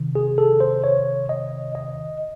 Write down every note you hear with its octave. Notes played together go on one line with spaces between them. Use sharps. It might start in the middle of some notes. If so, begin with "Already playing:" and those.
Already playing: C3 D#3
G#4
A4
C5
C#5
D#5
D#5